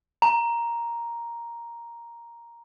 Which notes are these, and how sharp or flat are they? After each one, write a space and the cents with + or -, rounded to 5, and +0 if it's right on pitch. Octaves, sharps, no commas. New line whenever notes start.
A#5 +5